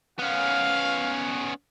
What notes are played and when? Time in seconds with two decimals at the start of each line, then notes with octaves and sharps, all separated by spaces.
0.19 B3 C#4 F5